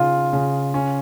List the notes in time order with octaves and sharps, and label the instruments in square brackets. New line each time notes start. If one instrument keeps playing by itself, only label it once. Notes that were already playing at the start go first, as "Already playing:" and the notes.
Already playing: [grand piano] C#3 D#4 [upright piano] F4
[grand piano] C#3
C#4